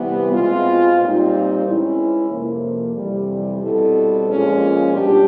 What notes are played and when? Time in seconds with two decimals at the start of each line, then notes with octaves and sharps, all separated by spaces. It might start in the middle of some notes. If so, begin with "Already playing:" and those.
Already playing: C3 E3 G3 B3
0.33 B2 G#3 C4 F4
0.99 A#2 G3 C4 D#4
1.65 E3 G#3 C#4 E4
2.29 F2 C3 F3 A#3
2.96 F2 C3 E3 G3
3.61 B2 G3 C4 E4 A4
4.26 A#2 F3 G#3 C#4 F4
4.92 B2 G3 B3 D4 G4